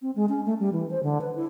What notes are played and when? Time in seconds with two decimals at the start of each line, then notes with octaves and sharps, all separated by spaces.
0.02 C4
0.16 G#3
0.29 C#4
0.46 A3
0.59 G3
0.73 E3
0.90 C5
1.03 D3
1.21 B4
1.36 E4